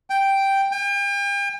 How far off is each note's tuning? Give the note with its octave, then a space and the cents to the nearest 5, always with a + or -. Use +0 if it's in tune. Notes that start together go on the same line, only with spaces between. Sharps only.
G5 +0
G5 +40